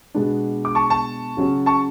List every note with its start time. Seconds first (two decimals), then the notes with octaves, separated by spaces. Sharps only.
0.14 B2 G#3 B3 D4
0.65 D6
0.75 A5 C#6
0.90 A5 C#6
1.37 C#3 F#3 C#4
1.66 A5 C#6